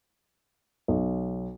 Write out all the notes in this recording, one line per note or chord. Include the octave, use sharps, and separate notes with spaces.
B1